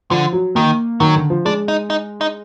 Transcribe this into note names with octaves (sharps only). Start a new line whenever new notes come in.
D3 F3
F#3
D#3 A#3
D#3 F#3
D3
F3
G#3 D4
D#4
D#4
D#4